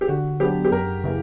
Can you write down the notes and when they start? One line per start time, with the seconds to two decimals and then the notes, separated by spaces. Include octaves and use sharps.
0.01 G4
0.08 D3 F#4
0.40 F#3 B3 D4 G4
0.65 G4
0.71 F#2 A#4
1.04 C#3 E3 A#3